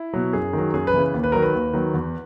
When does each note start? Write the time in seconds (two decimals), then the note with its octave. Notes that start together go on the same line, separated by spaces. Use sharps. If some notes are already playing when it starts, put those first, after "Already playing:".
Already playing: E4
0.13 B2 F#3
0.33 F#2 G#4
0.53 D#3 F#3
0.74 F#2 G#4
0.87 B4
0.94 C#3 E3
1.14 D#2
1.24 B4
1.32 D#3 F#3 A#4
1.43 B4
1.54 D#2
1.73 D#3 F#3
1.94 E2